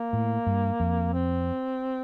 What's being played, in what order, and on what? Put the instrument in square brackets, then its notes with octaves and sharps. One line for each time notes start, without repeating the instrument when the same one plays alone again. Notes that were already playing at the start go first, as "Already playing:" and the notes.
Already playing: [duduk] A#3
[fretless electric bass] A2
G2
F2
[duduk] C4